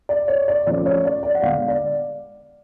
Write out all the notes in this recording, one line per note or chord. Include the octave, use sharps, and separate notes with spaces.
D5
C#5
D5
F3 A3 C#4 D5
C#5
D5
D5
F#5
D3 G#3 B3 F5
D5